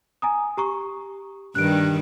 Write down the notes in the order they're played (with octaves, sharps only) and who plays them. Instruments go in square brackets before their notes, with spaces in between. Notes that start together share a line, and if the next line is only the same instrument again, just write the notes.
[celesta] G#5 A#5 D#6
G4 A#5 C#6
[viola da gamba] G2 D#3 G3 [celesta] F#6 D7